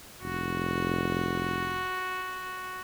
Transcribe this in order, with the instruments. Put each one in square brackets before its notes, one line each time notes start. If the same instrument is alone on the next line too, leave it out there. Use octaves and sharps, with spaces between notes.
[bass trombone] F1 [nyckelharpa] F#4